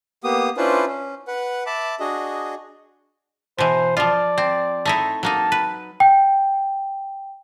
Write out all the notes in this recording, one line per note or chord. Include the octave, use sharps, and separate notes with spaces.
A#3 B3 G4 D#6
C#4 D4 E4 F4 B4 C5
C#4
B4 F#5
E5 A5 B5 D6
D4 F#4 G#4 D#5
B2 E3 C5
F3 F4 D5
C4
A3 D#4 E4
F#3 A#3 D#4 A5
B4
G5